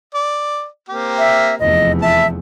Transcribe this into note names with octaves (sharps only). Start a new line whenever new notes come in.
D5
A#3 C4 G4
E5
F1 E2 D#5
E3 E5 A5